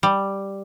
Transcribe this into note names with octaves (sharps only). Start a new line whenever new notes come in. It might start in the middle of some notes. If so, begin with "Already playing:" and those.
G3